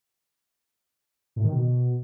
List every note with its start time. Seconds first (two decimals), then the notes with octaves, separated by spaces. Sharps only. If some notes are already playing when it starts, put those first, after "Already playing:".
1.36 A2
1.44 D#3
1.52 B2